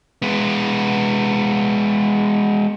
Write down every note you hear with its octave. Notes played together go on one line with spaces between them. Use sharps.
G#3 B3